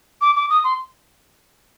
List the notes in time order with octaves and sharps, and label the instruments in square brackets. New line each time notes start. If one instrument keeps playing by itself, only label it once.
[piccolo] D6
D6
D#6
C6